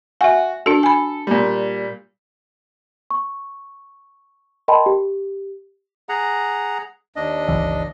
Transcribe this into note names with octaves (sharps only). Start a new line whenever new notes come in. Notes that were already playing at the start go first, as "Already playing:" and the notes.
F#4 E5 G#5
D4 F#4 A4
G#5 B5
A#2 G3
C#6
A#4 D#5 G5 A5 B5 C6
G4
G#4 F#5 A#5
D#2 D4 D#5
G1 C#2 E3